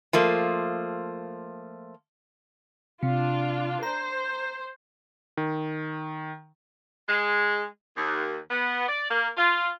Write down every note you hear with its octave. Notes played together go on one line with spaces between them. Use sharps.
F3 A3 A#3
C3 D4 F4
C5 A#5
D#3
G#3
D#2
B3
D5
A#3
F4